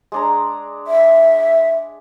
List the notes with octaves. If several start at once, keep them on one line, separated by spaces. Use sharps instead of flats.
G#3 D4 A#5
E5